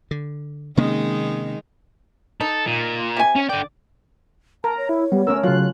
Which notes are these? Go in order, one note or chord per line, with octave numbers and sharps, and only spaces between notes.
D3
C3 D#3 G#3 A#3 C#4 D#4
D#4 A4
A#2
C3 G#5
C#4
D3 D5 G5
A#4 A5 A#5
C#5
E4
G3 B3
A3 C#4 A#4 E6
C#3 F#3 F4 F#6